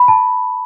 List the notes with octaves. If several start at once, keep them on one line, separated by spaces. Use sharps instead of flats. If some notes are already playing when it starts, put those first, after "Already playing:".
Already playing: B5
A5